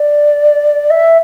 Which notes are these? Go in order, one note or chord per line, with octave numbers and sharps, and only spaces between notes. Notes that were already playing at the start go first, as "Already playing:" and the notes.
Already playing: D5
E5